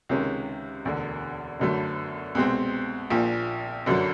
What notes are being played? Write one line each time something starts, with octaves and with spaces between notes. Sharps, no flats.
C#2 C3 D#3 G#3 C#4
E1 D2 D3
G1 F#2 D3 F#3 A3
C2 B2 G#3 C4
A#1 A#2 F3
G1 F#2 D3 F#3